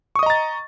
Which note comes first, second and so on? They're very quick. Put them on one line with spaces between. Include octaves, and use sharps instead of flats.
C#6 D#6 D#5 A#5 A6